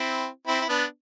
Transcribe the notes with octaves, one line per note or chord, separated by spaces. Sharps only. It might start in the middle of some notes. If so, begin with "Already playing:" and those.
Already playing: C4 E4
C4 E4
E4
B3 D4